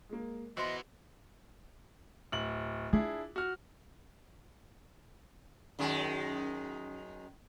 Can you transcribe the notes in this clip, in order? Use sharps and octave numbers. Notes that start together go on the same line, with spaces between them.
G#3 A#3
E3 B3 F#4 C5 D#5 E5 C6
D1 F#7
D4 E4 F4 G#4
F#4 F6
F#2 D#3 G#3